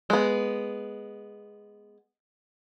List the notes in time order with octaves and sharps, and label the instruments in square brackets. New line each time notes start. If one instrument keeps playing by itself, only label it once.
[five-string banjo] G#3 B3